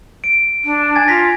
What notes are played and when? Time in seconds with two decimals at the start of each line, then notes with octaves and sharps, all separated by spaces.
0.24 D7
0.64 D4
0.95 G#5 G#6 A6
1.08 F4 A#6 B6